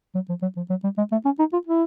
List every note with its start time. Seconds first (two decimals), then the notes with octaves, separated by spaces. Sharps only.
0.15 F#3
0.29 F3
0.42 F#3
0.57 F3
0.70 F#3
0.84 G3
0.98 G#3
1.12 A3
1.25 C#4
1.39 D#4
1.53 F4
1.67 E4